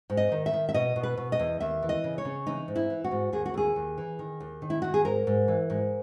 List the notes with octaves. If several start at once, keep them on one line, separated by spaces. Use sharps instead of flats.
G#2
D#5
D#3
E5
D#3
E5
B2 D#5
B2
B4
B2
D#5
E2
D#2 E5
E3
D#5
C#3
C#5
C#3
E3 D#4
G#2
E4
E3
F#4
G#2
D#2 G#4
F#4
D#2 G#4
D#2
E3
D#3
D#2
D#3
E4
D#3 F#4
G#4
G#2 A#4
G#2
E3
G#2